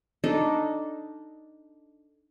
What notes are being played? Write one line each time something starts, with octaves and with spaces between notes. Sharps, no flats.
D4 D#4 A4